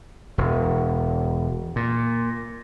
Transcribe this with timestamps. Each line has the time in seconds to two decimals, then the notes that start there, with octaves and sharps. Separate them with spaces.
0.38 E1
1.76 A#2